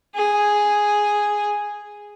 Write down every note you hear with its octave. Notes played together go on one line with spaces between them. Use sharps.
G#4